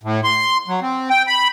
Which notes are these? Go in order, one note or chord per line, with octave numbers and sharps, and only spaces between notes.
A2
C6
F#3
C4
G5
B5